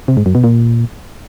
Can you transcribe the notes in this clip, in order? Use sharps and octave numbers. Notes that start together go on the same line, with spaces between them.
C3
G#2
F#2
B2
A#2